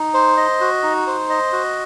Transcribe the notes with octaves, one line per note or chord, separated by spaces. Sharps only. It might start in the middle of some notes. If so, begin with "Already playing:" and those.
Already playing: D#4
C5
D#5
F#4
D#4
C5
D#5
F#4